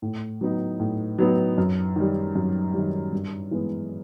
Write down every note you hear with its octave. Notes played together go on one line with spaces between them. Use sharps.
A2
F#3 B3 D#4
A2
F#3 B3 D#4
F#2
D#3 G3
F#2
D#3 G3
G2
E3 G#3 B3